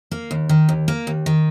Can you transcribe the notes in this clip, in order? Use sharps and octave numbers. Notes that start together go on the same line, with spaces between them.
A#3
D#2
D#3
D#2
A#3
D#2
D#3